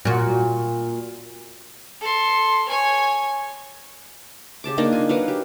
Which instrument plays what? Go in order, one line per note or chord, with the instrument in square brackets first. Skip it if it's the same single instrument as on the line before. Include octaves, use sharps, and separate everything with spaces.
[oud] A#2 F#4
[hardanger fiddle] A4 C6
C#5 G#5
[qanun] C#3 G4 A5 D6
A#3 D4 D#4 D5
F4 G#5
F#3 B4 F5
G4